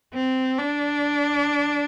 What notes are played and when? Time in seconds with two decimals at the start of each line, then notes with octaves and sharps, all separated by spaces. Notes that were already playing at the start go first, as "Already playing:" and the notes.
0.14 C4
0.58 D4